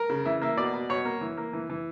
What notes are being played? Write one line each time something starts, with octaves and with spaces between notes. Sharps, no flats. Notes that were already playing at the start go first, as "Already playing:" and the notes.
Already playing: A#4
C#3
E3 E5
A#3 E5
B2 D5
B2
B2 C#5
A#3
E3
A#3
E3
E3